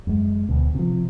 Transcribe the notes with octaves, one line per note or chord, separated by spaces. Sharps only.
F#2 G#3
D2 B2
C3 F3